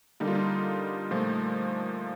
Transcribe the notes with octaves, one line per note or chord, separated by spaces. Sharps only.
D3 G3 A#3 D#4
F4
D#4
A#2 F3 A3